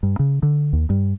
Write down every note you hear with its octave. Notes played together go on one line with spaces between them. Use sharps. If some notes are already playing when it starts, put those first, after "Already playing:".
G2
C#3
D3
D#2
G2